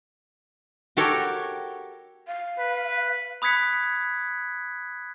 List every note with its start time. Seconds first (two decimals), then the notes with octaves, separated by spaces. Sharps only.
0.97 F#4 G4 A4 A#4 C#5 G5
2.27 F5
2.59 B4
3.42 B5 D#6 F#6 G#6 B6 C#7